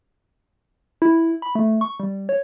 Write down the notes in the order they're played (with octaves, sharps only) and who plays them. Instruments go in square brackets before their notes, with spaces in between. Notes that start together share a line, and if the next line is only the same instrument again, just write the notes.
[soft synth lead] E4
B5
A3
C#6
G3
C#5